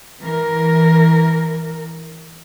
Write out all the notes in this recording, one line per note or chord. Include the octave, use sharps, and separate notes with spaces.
E3 A#4